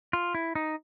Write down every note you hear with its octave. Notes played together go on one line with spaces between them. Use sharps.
F4
E4
D#4